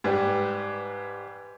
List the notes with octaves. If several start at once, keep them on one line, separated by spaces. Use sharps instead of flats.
G#2 G3 G4 B4 D5